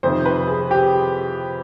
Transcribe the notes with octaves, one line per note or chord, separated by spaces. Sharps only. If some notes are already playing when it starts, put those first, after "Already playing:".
F2 C3 D#3 C5
B4
G#4
G4